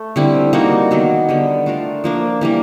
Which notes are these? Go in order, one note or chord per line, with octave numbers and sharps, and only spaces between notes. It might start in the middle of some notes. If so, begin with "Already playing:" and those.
Already playing: A3
D3 G3 C4 E4
G3 A#3 D#4 F#4
D#3 F#3 B3
D3 G3 B3
A3 D4 F4 A#4
F3 A#3 D4
E3 G3 A#3